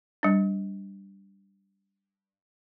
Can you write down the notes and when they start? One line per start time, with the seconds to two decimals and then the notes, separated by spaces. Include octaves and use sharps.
0.23 G3 D4